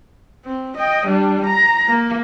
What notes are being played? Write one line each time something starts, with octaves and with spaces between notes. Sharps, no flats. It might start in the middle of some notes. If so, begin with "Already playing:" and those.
C4
D#5 G5
G3 D4
A#5
A#3